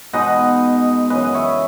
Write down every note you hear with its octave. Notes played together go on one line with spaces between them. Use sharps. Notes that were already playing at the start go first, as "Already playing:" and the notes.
B2 G#3 D#4 B4 D#5
F#2 C#3 E3 B4 D#5
C#5 E5